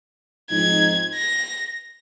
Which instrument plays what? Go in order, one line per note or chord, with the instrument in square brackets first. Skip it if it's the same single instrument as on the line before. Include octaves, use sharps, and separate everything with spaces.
[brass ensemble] G#2 F3 C4 D#4 [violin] G#6
[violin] A#6